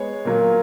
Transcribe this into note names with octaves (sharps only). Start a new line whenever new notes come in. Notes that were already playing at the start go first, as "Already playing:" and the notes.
Already playing: G#3 B3 C#5
A#2 F#3 A#3